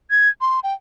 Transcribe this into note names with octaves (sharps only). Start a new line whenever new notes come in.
G#6
C6
G5